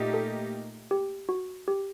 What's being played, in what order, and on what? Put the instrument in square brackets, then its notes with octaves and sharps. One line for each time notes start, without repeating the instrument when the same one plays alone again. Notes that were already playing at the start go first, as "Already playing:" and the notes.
Already playing: [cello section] A#2 A3 D#4 G4 A#4
[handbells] A4
G4
F#4
G4